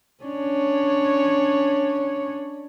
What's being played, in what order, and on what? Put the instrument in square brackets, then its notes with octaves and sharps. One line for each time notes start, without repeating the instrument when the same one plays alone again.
[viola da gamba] C#4 D4 C#5